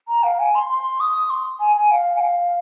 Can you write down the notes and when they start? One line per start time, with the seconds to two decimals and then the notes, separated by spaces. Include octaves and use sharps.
0.08 A#5
0.23 F5
0.39 G#5
0.55 C6
0.69 C6
1.00 D#6
1.30 C6
1.60 G#5
1.76 G#5
1.91 F5
2.16 G#5
2.21 F5